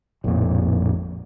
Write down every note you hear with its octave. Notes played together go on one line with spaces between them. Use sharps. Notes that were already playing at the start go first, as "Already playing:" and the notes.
A1 F2 A#2